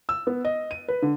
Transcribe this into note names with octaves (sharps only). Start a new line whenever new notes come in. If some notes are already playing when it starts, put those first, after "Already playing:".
E6
B3
D#5
D#7
B4
D3